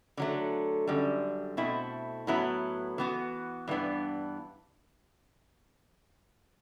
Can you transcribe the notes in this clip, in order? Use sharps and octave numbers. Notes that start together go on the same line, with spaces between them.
D3 F#3 A3
F#2 D3 G3
B2 A3 C4 E4
A2 F#3 B3 E4
E3 B3 F#4
G2 E3 B3 D4